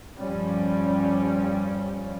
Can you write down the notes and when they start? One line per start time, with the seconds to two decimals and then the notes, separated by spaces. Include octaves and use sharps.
0.18 G2 F3 G3 C#4